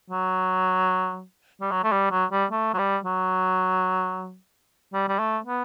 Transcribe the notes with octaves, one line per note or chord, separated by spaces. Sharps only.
F#3
G3
F#3
A3
G3
F#3
G3
A3
F#3
G3
F#3
G3
G3
A3
B3